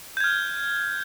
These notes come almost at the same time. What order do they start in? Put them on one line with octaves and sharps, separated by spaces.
G6 G#6 F6